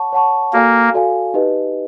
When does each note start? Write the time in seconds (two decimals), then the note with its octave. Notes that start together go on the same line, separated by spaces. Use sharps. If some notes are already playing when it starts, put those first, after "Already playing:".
Already playing: C#5 F#5 A5 C#6
0.13 C#5 F#5 A5 C#6
0.53 A#3 F#4 A4 D5 F5 G#5
0.94 F#4 A4 D5 F5 G#5
1.34 D#4 G4 B4 D#5